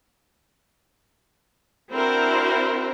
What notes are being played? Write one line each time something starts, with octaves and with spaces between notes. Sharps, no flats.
C4 D4 E4 F#4 A#4 C5